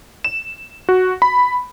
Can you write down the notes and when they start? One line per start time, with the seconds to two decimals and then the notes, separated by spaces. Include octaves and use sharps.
0.24 E7
0.89 F#4
1.22 B5